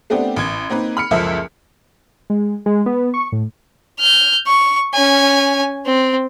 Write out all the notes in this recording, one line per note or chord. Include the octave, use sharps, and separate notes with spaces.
A3 B3 C4 D4 G4
A1 G#6
A#3 C4 D#4 B4
B5 F6 C#7
F#1 C#2 F3 A4 E5
G#3
G#3
B3
C#6
A2
F6 G6
C#6
C#4 G#5
C4